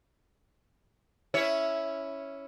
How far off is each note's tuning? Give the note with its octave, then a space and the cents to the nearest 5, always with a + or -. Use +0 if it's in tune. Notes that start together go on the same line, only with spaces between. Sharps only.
C#4 +0 E4 +0 C#5 +0